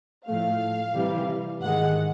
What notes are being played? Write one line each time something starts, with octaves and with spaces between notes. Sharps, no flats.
A2 F3 A3 F5
C3 E3 G3
G#2 D#3 G#3 F#5